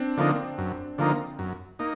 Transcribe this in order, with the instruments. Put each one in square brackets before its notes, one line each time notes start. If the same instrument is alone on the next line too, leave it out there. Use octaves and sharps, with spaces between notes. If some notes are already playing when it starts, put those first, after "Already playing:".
Already playing: [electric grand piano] C4 D4
[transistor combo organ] D3 F3 A#3 D#4
F#2
D3 F3 A#3 D#4
F#2
A#3 D#4